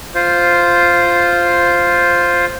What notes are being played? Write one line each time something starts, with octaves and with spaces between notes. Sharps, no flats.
F4 C5